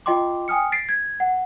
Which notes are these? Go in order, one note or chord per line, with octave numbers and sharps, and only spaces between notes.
F4 D#5 G5 C6 D6
G5 G#5 D#6 F6 C#7
A6 B6 C7 D7
G#6
F#5